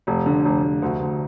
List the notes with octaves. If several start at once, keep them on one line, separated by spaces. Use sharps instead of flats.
F1
D3
F1
F1
D2
D2